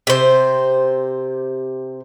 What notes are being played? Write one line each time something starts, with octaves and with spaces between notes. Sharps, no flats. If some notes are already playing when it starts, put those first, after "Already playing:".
C3 C5